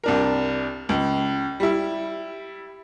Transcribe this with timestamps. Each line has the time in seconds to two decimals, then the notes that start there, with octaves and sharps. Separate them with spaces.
0.04 C2 D4 A#4
0.89 C#2
1.60 G3 E4